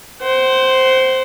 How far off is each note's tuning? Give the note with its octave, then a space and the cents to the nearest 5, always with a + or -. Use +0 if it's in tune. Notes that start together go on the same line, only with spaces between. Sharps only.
C5 +0 F#5 +45